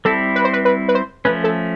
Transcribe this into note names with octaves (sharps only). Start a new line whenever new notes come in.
G3 C4 E4 A4
B4
C5
B4
B4
B4
C5
F3 A3 C#4 B4
A4